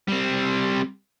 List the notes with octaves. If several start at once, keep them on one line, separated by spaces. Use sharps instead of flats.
G3 C4